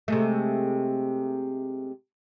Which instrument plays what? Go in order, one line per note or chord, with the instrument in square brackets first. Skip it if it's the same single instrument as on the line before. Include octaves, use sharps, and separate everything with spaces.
[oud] C3 G#3 A3